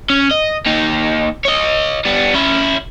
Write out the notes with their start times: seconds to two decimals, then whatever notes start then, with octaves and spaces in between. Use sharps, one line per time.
0.10 C#4
0.31 D#5
0.66 D#2 D#4
1.45 C#5 D#5
2.05 G3 B3
2.34 C#4 E4